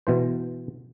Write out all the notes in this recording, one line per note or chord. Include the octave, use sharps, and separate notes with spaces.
B2 E3 C5